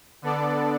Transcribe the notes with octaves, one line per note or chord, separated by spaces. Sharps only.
D3 B3 D4 A4 D5